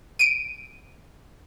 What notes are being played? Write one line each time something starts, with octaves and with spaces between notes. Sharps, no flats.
D7 D#7